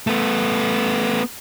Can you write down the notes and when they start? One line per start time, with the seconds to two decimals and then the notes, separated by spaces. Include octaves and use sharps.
0.07 A3 B3